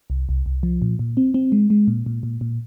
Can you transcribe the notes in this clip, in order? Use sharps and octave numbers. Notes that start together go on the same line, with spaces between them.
C2
C2
C2
F3
A#2
A#2
C4
C4
G#3
G#3
A#2
A#2
A#2
A#2